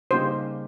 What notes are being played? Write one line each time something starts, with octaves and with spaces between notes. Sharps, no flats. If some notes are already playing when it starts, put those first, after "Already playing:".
C#3 G3 A#3 D#4 G4 C5